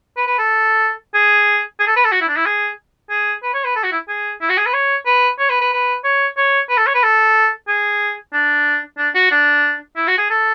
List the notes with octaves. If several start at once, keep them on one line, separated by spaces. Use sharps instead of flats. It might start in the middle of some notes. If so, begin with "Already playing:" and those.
B4
B4
A4
G#4
G#4
A4
B4
A4
F#4
E4
D4
E4
G#4
G#4
B4
C#5
B4
A4
F#4
E4
G#4
E4
F#4
G#4
B4
C#5
B4
C#5
B4
B4
B4
C#5
C#5
B4
A4
C#5
B4
A4
G#4
D4
D4
F#4
D4
E4
F#4
G#4
A4